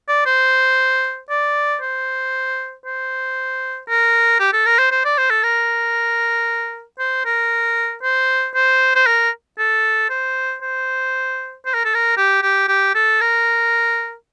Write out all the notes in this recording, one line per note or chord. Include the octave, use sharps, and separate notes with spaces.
D5
C5
D5
C5
C5
A#4
G4
A4
A#4
C5
C5
D5
C5
A4
A#4
C5
A#4
C5
C5
C5
A#4
A4
C5
C5
C5
A#4
A4
A#4
G4
G4
G4
A4
A#4